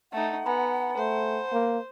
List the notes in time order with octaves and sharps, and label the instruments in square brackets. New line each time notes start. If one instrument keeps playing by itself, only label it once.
[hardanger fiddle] A3 D#4 [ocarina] F#5
[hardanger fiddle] B3 [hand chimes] G#5 A#5 B5
[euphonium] A3 [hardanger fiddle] C5
[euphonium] A#3